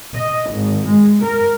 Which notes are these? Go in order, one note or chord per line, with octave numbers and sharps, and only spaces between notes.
D#5
G#1
G#3
A#4